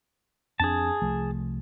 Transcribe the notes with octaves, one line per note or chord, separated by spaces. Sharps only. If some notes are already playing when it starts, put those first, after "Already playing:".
F2 C4 D4 G#4 A5
C2 F3 A3